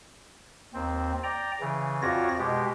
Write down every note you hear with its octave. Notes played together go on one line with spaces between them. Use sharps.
D#2 C4
D5 G5 A#5
C#3 E3
F2 F4 F#4 C#5 D5 A#6
B2 G#3 G4